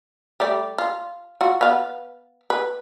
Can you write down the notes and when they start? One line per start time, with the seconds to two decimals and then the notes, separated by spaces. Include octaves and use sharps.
0.40 G3 A3 D5
0.78 F4
1.41 F4 F#4
1.61 B3 B4 F5
2.50 B4